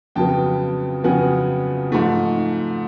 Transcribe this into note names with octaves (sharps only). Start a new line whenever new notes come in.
F2 C#3 F#3 B3 G5 A5
F2 C#3 F#3 B3 F#5 G#5
G#2 F3 A3